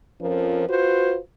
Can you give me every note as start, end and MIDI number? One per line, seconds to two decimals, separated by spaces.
0.20 0.66 41
0.20 0.66 53
0.20 0.66 61
0.20 0.66 70
0.68 1.18 65
0.68 1.18 66
0.68 1.18 71
0.68 1.18 72